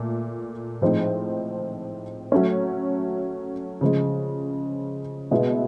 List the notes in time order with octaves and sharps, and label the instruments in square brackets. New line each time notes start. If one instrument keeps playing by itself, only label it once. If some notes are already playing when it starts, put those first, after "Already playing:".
Already playing: [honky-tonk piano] A#2 A3
A2 F3 G#3 C4 D#4
F#3 A3 C#4
C#3 F3 G#3
B2 G#3 B3 E4